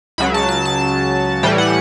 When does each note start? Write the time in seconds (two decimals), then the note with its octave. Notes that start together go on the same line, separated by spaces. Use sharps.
0.18 C#2 C#3 F#3 B5
0.34 A5
0.49 A5
0.66 A5
1.43 A2 E3 G3 G5
1.58 F#5